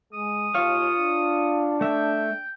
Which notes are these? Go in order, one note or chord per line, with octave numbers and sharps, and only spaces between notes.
G#3 D#6
D#2 F4 C#5 F5
D4
A3 E5 G5